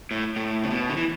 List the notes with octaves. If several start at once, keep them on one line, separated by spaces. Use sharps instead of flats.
A2
A2
C#3
B2
D3
E3